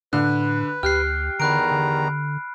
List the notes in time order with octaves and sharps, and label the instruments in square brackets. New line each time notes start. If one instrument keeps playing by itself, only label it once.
[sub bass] A2 [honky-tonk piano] D3 [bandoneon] B4 [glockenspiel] F#6
[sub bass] D2 [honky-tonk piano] G4 [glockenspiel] F6 F#6 C7
[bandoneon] E2 D#3 A#5 [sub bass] D3 [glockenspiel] B5 F#6 D7
[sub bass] D3